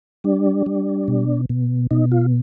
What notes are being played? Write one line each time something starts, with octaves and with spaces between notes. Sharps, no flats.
G3 D4
G3
B2
B2
B2 D#4
F4